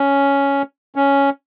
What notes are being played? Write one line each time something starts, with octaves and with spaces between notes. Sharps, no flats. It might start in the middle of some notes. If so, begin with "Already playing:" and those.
Already playing: C#4
C#4